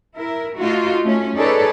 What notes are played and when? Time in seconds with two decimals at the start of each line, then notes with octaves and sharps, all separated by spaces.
0.16 E4 A#4
0.58 A3 D#4 F4 F#4
1.04 A3 C#4
1.36 D#4 G#4 A4 B4 C#5 D5